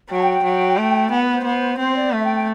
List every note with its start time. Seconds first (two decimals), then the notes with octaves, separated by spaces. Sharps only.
0.10 F#3 G5
0.16 A5
0.21 G5
0.33 G5
0.44 F#3
0.78 A3
1.10 B3 F#5
1.22 B4
1.34 C5
1.44 B3
1.79 C4 C5
1.95 D5
2.12 A3 E5
2.23 G5
2.34 G5